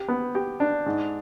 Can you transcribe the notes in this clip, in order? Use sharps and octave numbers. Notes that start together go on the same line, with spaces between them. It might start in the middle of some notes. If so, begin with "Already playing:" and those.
Already playing: G4
B3
G4
D4
G#2